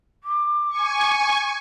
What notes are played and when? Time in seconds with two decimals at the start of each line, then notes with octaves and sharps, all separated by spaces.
0.23 D6
0.69 G#5 C#6